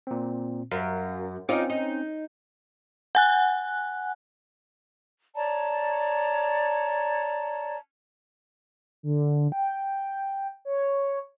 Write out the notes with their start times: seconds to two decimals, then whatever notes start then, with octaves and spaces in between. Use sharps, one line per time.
0.07 A#2 C4
0.71 F#2 F5
1.49 C4 C#4 D#4 F4 D5
1.70 D#4
3.15 F#5 G#5 F#6
5.35 C#5 D5 A5 A#5
9.03 D3
9.52 G5
10.65 C#5